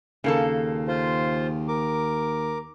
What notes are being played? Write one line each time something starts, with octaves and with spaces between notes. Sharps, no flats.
D#2 C#3 A#3 A4
F4 C5
A#4 D6